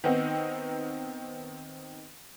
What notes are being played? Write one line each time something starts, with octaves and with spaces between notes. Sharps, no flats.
D#3 B3 C4 D#4